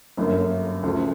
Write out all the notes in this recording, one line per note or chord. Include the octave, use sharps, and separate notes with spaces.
G1 F#2 D3 F#3 A#3
D2 C#3 F3 A3